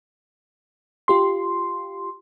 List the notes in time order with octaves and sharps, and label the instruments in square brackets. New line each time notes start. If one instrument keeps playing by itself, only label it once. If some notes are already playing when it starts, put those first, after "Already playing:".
[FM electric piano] F4 G4 C6